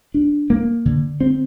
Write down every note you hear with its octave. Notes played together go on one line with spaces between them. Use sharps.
D4
A#3
D3
C4